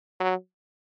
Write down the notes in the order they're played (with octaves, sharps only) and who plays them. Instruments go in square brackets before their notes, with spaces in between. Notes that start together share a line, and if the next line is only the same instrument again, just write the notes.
[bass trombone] F#3